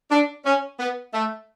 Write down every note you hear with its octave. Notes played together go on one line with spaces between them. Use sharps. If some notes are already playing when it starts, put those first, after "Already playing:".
D4
C#4
B3
A3